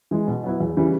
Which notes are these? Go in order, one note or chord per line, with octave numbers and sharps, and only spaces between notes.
E3 G#3
B2
F#3 B3 E4
E2
C#3 E3 G3